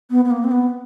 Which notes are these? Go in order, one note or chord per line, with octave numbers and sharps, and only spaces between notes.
B3
B3
A#3
C4
B3